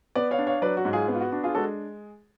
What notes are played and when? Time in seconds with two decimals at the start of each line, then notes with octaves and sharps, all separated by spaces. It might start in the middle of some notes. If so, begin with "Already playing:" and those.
0.15 B3 B4 D5
0.31 C#5 F5
0.38 D4
0.47 C#5 F5
0.62 F#3 B4 D5
0.77 F#4
0.85 G#2
0.93 F4 G#4
1.08 B3
1.15 F4
1.20 F#4
1.32 D4 F#4
1.43 F4 G#4
1.55 G#3 F#4 A4